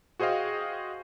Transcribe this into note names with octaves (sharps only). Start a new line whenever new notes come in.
F#4 G#4 C5 D#5 F5 G5